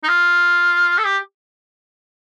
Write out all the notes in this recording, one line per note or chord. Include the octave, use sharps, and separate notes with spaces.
D#4
F4
A4
G4